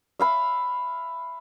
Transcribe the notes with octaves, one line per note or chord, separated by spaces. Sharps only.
E5 F5 B5